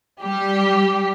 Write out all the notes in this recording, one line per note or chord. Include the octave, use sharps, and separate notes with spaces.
G3 G4